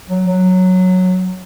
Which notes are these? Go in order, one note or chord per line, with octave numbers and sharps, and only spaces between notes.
F#3
F#3